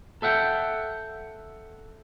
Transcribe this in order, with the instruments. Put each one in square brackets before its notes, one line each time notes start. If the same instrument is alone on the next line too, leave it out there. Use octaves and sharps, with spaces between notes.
[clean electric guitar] A4 E5 F#5 G5